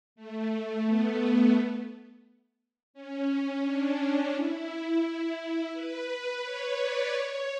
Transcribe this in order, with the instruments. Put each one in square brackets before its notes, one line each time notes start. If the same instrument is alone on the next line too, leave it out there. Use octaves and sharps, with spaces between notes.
[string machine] A3
A3
B3
C#4
D4
E4
B4
C#5
D5
C#5